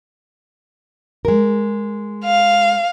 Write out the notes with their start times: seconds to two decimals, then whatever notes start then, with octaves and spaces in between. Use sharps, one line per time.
1.25 G#3 A#4
2.24 F5